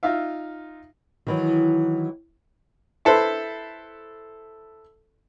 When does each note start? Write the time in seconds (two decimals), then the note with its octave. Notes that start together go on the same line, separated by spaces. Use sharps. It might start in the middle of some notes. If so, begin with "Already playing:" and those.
0.03 D#4 F4 E5 F5
1.27 D#3 E3 F#3
3.05 E4 A4 B4 C5